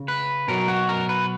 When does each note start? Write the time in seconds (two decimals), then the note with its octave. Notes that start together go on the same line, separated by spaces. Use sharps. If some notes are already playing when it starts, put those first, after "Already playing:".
Already playing: C#3
0.08 B4
0.48 B2 F#3 A#4
0.68 F#4
0.89 A#4
1.09 B4